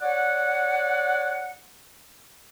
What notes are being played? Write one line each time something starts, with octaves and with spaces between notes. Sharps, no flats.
C#5 D5 F#5